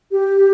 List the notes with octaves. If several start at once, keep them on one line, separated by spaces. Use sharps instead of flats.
G4